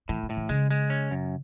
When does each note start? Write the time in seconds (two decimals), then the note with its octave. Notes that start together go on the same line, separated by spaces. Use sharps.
0.09 A2 E3
0.23 D#3
0.30 A2
0.37 E3
0.49 C#3 G#3
0.71 G#3
0.90 C#4
1.11 F#2